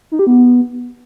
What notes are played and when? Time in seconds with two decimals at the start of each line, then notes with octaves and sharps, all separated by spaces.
0.12 D#4
0.19 G4
0.27 B3